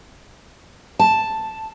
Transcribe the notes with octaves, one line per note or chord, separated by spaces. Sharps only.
A5